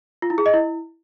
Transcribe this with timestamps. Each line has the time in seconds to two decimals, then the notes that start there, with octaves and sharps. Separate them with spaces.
0.22 F4
0.30 E4
0.38 G#4
0.46 D#5
0.53 E4